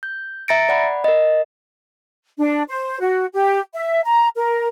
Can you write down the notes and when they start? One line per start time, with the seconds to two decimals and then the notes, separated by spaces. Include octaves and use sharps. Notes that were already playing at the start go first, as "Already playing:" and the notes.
0.03 G6
0.48 E5 A#5 A6 A#6 C#7 D7
0.69 D5 F#5 B5
1.04 A#4 D#5
2.39 D4
2.69 C5
3.01 F#4
3.33 G4
3.74 E5
4.05 A#5
4.36 A#4